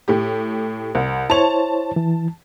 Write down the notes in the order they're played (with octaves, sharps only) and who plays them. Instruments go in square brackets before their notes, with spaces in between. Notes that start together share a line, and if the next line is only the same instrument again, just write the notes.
[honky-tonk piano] A2 G4
C2
[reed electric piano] E4 C5 C#5 [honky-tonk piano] A5 F7
[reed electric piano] E3